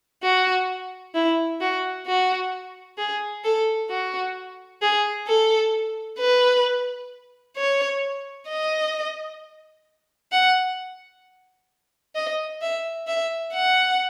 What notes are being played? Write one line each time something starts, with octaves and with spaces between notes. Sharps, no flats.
F#4
E4
F#4
F#4
G#4
A4
F#4
G#4
A4
B4
C#5
D#5
F#5
D#5
E5
E5
F#5